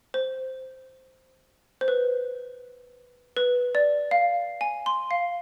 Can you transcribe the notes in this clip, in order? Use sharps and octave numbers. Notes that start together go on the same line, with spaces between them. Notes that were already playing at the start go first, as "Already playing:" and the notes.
C5
C5
B4
B4
D5
F5
G#5
C6
F5